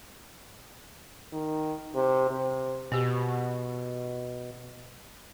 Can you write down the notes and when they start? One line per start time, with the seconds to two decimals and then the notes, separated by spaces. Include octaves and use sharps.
1.33 D#3
1.95 C3
2.31 C3
2.92 B2 B3 G4